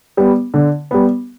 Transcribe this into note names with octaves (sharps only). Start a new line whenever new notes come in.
G3 B3
D3
G3 B3